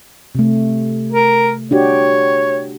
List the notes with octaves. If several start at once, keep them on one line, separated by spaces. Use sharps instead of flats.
C3 A3
A#4
D4 F#4 G4 C#5